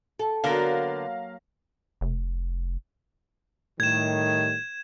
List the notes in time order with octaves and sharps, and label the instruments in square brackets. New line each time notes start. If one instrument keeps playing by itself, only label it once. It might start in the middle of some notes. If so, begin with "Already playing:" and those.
[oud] A4 [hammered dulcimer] G5
[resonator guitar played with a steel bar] D3 B3 A#4 [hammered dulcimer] F#3 A#3 A#5 [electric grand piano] F5 A#6
[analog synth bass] F1
[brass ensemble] A2 D#3 G3 [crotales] G#6 E7